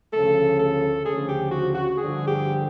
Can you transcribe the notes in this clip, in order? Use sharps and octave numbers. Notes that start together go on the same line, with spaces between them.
D2 C#3 F3 A4
A4
D2 C#3 F3 G#4
G4
F#4
F#4
G2 D3 F3 G#4
G4